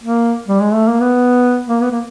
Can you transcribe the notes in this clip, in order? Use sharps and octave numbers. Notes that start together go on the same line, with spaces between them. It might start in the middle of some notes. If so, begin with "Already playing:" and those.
A#3
G3
G#3
A3
A#3
B3
A#3
B3
A#3